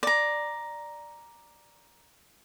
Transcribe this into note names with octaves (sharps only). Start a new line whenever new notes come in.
D5 A#5